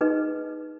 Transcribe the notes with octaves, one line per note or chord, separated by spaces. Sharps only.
D#4 G#4 B4 D#5